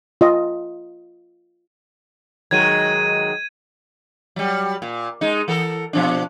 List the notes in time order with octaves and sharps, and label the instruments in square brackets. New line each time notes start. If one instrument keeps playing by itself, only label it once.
[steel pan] F4 D#5
[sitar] D#3 F#3 G#3 [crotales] G#6 D#7
[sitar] F#3 G3
A#2
G#3 D#4
E3 A4 A#4
B2 F3 D4